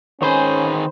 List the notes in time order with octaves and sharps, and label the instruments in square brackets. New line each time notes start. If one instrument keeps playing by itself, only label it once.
[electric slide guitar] D#3 G#4 [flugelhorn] C#4 [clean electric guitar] B4 C5